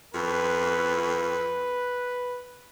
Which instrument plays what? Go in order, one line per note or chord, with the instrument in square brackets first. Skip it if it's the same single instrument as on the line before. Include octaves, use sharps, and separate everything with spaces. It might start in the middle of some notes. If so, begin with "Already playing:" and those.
[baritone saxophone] F2 [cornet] B4